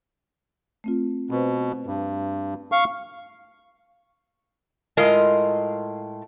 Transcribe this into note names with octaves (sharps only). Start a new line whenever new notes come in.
A3 C4 F4
B2 C4 B4 C5
G2
F5 C#6
A2 G#3 F4 A#4 D#5